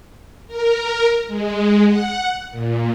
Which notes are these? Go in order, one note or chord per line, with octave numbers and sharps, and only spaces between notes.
A#4
G#3
F#5
A#2